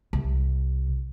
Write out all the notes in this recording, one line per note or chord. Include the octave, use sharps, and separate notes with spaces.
C2